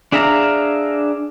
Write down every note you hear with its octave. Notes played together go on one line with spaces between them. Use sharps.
D4 G#4 E5 F5 A#5